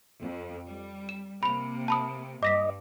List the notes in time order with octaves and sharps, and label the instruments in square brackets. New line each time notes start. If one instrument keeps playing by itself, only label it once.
[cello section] F2
G3
[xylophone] E7
[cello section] C3 A#3 [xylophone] B5 F7
[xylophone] A5 B5 D#6
[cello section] G2 [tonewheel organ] D#5 [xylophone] D6 A#6 B6